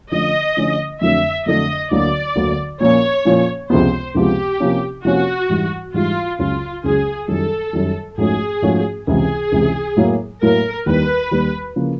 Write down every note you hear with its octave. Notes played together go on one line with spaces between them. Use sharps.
D3 F3 A3 C#4 D#5
D3 F3 A3 C#4
F2 D3 F#3 A3 D4 E5
F2 D3 F#3 A3 D4 D#5
D2 D3 F#3 A#3 D5
D2 D3 F#3 A#3
A#2 F3 A#3 C#4 C#5
A#2 F3 A#3 C#4
C#2 C3 F3 G#3 B3 C5
C#2 C3 F3 G#3 B3 G4
C3 F3 A#3 C#4
C3 F3 A#3 C#4 F#4
G#2 E3 G3
G#2 E3 G3 F4
C#2 C#3 F#3 F4
C#2 C#3 F#3 G#4
F#2 D#3 G3 A4
F#2 D#3 G3
G#2 F3 A3 C#4 F#4 G#4
G#2 F3 A3 C#4 F#4
C#2 C3 E3 G#4
C#2 C3 E3
A2 F#3 A#3
A2 F#3 A#3 A#4
D#2 D#3 G3 B4
D#2 D#3 G3
C#3 F3 A#3